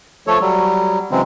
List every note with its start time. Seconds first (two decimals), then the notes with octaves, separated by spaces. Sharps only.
0.27 F3 A3 A4 C#5
0.41 F#3 G3
1.11 C#3 E3 F#3 G#3 C4